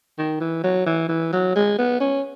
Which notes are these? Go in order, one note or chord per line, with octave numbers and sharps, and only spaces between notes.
D#3
E3
F#3
E3
E3
F#3
G#3
B3
C#4